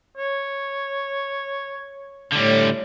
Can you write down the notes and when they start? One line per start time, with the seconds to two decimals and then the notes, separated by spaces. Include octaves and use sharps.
0.17 C#5
2.32 A2 D3 G3